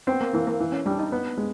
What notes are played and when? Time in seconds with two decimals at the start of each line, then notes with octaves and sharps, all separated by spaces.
0.07 B3 C4
0.21 A#3
0.34 E3 A#3
0.47 A#3
0.60 E3
0.72 C#4
0.86 G3 D4
0.99 D#4
1.12 B3
1.38 G#3